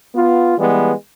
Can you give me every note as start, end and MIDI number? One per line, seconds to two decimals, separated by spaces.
0.14 0.55 59
0.14 0.55 65
0.58 0.93 52
0.58 0.93 55
0.58 0.93 56
0.58 0.93 59